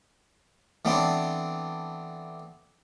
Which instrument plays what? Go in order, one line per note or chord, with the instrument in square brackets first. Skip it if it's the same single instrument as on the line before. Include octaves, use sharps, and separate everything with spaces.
[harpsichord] E3 A3 B3 C4 D4